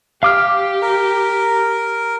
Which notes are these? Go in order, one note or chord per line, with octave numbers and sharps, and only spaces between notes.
G4 F5 D6 F6
A#4